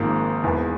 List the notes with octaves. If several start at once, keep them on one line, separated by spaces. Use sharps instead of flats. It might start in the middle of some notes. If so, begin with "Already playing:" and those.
Already playing: G#1 G#2 F3 A#3
E1 E2 E3